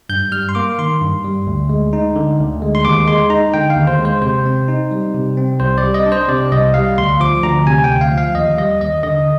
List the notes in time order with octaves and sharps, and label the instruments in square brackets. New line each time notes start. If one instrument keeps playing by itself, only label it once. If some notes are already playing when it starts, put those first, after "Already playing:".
[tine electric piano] G2 G6
G3 F6
C6
A#3 D6
D#3 C6
G2
G3
D2
G#3
D#4
D3
D2
G#3
C6
D#2 D6
G#3 C6
D#4 A#5
D3 G5
F5
D#2
C5
G#3
C5
C3 C5
C4
D#4
G3
C3
C4
C2 C5
D5
G3
D#5
D4
C5
C3 D5
C2 D#5
G3 F5
D2 C6
F3 D6
D2 A#5
C3 G#5
G5
D2
F5
F3
F5
D#2 D#5
G3 D#5
D#2 D#5
D3 D#5